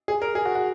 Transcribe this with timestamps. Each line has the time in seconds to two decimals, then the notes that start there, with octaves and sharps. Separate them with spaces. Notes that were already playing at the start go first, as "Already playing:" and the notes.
0.08 G#4
0.22 A#4
0.35 G#4
0.45 F#4
0.55 F#4